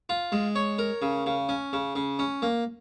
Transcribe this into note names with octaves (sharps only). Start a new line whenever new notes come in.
F4
G#3
C#5
A#4
C#3
C#3
C#4
C#3
C#3
C#4
A#3